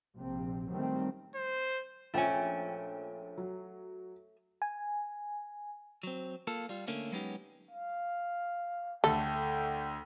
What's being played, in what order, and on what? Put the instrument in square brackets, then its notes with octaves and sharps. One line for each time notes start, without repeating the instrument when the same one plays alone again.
[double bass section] A#1 C3 C4
D#3 F#3 G3 A3 C4
[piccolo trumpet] C5
[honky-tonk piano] A#1 F3 G5 [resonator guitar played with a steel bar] A3 C#4
[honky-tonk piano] F#3
[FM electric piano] G#5
[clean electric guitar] F#3 C4
A#3 F4 A4
G3 F4
D3 A3 A#3 C#4
F#3 G#3 B3 C#4 D#4 G4
[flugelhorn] F5
[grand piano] D2 A3 [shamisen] A4 [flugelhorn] G5